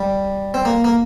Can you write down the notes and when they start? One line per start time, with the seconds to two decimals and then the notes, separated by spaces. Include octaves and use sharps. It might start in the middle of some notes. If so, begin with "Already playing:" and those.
Already playing: G3
0.54 C4
0.65 A#3
0.84 A#3